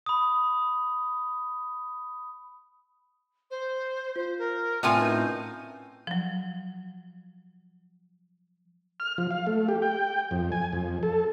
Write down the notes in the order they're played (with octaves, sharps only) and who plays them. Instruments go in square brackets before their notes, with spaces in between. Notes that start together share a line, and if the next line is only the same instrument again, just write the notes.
[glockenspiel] B5 D#6
[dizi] C5
[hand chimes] F4 [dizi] C5
[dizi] A#4
[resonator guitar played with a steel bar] A2 F4 G#5 [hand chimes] C4 B4 [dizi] C6
[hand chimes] C#4 A#4 G6 [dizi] D#4
[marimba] F3 F#3
[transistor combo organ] F6
F3
F5
A3
G4
G5
F2
G#5
F2
A4